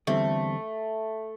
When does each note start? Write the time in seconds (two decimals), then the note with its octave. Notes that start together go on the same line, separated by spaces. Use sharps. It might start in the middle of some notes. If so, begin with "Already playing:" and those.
0.07 E2 D3 G3 A3 C4 E4